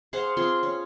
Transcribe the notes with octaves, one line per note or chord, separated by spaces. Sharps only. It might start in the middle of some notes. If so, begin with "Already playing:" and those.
G#4 C5 F5 F#5
C4 F4 G#4 C6
C#4